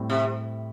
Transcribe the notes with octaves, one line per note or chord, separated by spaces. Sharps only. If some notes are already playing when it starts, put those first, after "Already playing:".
Already playing: A2 G3 C4
C3